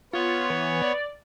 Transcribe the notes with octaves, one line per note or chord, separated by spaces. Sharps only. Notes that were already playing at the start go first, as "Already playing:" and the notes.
B3 F4 C#5
E3
D5